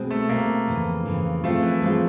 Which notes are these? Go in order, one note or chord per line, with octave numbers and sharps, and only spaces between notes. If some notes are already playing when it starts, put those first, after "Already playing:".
Already playing: B2 G#3 C4
A3
B2 G#3 A#3 C4
F2 C#3 E3
F2 C#3 E3
F3 G#3 A3 C4 F4
E3
F3 G#3 C4 F4